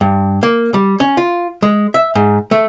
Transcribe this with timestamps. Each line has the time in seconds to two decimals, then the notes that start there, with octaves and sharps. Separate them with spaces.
0.01 G2
0.43 A#3
0.74 G3
1.00 C#4
1.17 F4
1.63 G#3
1.94 E5
2.15 G#2
2.51 A3